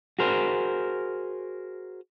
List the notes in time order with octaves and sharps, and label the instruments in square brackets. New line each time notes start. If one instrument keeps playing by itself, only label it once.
[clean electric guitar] F#4 G#4 A#4 C5